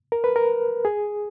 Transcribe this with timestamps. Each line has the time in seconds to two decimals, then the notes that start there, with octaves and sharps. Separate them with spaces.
0.12 A#4
0.24 B4
0.36 A#4
0.85 G#4